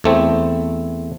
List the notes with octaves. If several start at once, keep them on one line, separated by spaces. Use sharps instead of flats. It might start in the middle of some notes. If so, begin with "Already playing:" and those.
E2 A3 C4